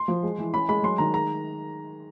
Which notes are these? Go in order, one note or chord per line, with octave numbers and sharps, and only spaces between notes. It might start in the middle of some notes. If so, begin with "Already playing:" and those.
Already playing: C6
F3
G#3
E3
C#4 B5
G#3 B5
F#3 C6
D#3 A#5
G#3 A#5